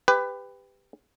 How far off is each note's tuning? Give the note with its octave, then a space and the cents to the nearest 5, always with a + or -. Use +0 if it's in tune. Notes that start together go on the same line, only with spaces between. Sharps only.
G4 +20 B4 +20